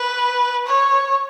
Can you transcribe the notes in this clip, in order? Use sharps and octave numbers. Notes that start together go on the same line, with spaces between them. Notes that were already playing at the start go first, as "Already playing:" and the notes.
Already playing: B4
C#5